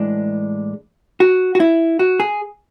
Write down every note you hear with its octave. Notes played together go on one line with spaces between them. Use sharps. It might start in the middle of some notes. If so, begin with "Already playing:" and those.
Already playing: A2 E3 G#3 D4
F#4
F#4
E4
F#4
G#4